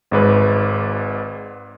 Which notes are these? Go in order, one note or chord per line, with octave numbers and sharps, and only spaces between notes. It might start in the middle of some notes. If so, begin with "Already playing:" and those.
G#1 G#2 B4